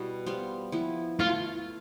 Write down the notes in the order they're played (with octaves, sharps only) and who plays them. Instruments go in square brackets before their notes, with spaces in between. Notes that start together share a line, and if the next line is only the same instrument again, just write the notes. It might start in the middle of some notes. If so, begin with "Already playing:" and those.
Already playing: [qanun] B2 G3 B3 E4
G3 B3 F4 C5
F3 B3 E4
[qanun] A3 E4 A4 [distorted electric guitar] F4